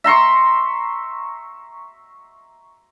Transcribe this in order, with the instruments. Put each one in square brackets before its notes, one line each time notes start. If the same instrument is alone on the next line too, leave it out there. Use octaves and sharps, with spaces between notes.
[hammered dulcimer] E5 A#5 C6 C#6